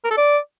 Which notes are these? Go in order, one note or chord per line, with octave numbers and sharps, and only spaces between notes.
A#4
A4
D5